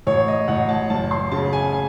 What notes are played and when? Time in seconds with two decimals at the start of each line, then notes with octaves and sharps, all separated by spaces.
0.07 A1 C#5
0.28 D#5
0.48 A1 F#5
0.68 A5
0.90 F#1 A5
1.11 C6
1.31 C#3 A5
1.53 G#5
1.73 G#5